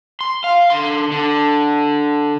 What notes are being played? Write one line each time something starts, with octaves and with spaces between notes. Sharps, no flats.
C6
F5
D3 C6
D3